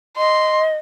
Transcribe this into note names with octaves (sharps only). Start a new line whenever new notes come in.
D#5 C6